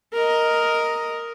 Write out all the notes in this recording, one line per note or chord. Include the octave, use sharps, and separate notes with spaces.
A#4 D#5